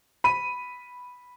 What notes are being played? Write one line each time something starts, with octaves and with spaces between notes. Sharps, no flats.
B5 D#7